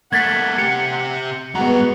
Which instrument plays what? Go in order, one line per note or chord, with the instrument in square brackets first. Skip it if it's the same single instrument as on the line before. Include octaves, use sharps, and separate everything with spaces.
[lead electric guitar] A3 A#3 [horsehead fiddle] F#5 [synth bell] G#6 A6 B6
[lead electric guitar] C3 G4 [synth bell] C#7
[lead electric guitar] G2 A#5 [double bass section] G#3 B3 [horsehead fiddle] F#4